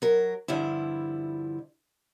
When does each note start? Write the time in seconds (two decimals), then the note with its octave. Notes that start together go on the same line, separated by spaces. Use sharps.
0.02 F#3 A#4
0.48 G2 D3 F3 E4